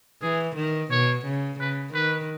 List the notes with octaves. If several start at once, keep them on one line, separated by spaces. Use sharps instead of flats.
E3 G#4
D#3
B2 C#5
C#3
C#3 B4
D#3 B4